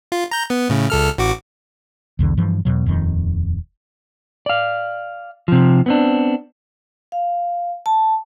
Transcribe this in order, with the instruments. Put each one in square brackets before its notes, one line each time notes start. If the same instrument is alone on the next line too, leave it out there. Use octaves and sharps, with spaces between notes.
[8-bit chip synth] F4
A#5 G6
B3
A2 C#3
C#2 A4 F6
A1 F#4 D6
[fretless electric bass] B1 E2 D3
G2 E3 F3
E2 B2 F#3
D#1 F2 D#3
[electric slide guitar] D5 F5
C3 F3
B3 C4 D4
[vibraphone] F5
A5